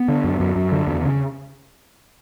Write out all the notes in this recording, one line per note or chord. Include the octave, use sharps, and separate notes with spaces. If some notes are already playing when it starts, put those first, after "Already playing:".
Already playing: B3
D3
F#2
F#2
F#2
D3
E2
C#3